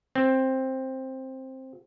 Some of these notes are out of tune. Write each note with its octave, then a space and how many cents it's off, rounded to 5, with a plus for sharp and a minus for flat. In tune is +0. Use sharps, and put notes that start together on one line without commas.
C4 +10